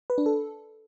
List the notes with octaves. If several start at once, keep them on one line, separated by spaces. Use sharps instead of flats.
B4
D4
A4